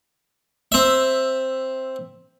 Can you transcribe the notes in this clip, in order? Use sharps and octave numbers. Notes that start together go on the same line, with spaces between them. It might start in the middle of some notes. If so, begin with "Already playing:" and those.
C4 E5